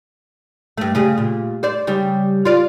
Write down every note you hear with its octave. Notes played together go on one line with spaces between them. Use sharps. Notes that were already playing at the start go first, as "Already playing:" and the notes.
G2 A3
C#3 G3 G#4
A#2
C5 D5
C#3 G3
F4 D5